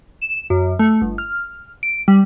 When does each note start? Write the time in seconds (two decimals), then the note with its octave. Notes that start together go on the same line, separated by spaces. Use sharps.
0.21 E7
0.50 F#2
0.79 A3
1.02 G1
1.18 F6
1.83 D7
2.08 G3